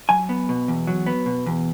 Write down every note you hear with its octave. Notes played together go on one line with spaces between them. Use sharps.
F#3 G#5
B3
B2
E2
F#3
B3
B2
E2